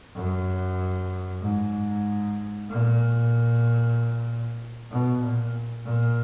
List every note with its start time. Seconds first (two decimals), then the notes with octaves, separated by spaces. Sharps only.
0.15 F#2
1.42 G#2
2.70 A#2
4.91 B2
5.23 A#2
5.86 A#2